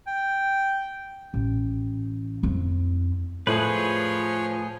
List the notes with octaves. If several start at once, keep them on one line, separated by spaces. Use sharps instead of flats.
G5
A1
F2 E4
A2 F3 A3 G#4 B4 C#5